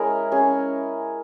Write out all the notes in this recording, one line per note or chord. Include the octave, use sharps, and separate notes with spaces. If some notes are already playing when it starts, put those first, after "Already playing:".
Already playing: G#3 C#4 E4 A#4
C#4 G#4